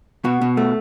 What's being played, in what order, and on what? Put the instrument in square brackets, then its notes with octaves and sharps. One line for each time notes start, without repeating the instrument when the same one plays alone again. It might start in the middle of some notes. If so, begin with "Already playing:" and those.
[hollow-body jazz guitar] B2 F#4
B2
A3